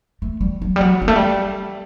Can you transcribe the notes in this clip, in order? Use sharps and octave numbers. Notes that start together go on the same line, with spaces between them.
A3
G3
F#3
G3
F#3
G3
A3
G3